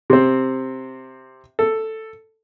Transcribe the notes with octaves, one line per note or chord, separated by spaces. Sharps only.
C3 C4
A4